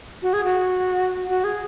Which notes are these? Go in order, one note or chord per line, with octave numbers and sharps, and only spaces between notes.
F#4
G#4
F#4
F#4
G#4